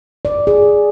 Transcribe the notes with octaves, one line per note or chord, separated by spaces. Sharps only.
D5
G#4